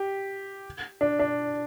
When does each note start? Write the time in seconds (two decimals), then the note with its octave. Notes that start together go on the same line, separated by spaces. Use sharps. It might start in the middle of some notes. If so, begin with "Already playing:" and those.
Already playing: G4
1.01 D4
1.19 D4